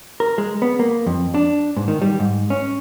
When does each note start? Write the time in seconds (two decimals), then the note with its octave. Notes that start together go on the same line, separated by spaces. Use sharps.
0.20 A#4
0.38 G#3
0.62 B3
0.79 A#3
1.07 F2
1.35 D4
1.77 G#2
1.88 D#3
2.02 G3
2.20 G#2
2.50 C#4